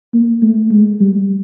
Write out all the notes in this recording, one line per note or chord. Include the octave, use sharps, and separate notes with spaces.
A#3
A3
G#3
G3